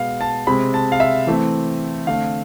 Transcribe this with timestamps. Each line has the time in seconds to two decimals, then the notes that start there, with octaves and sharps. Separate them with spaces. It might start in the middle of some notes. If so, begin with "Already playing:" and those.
Already playing: B2 G#3 B3 F5
0.21 A5
0.47 C3 G#3 C4 B5
0.74 A5
0.92 F5
1.00 E5
1.27 E3 A3 C4
2.07 D3 A3 C4 F5